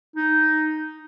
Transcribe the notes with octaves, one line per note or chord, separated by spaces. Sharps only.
D#4